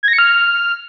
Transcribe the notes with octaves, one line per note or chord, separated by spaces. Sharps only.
G#6
A#6
C#7
F6